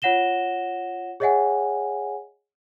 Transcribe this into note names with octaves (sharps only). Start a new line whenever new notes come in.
F4 C#5 F#5 A#6 E7 G7
G#4 C#5 D#5 E5 F#5 G#5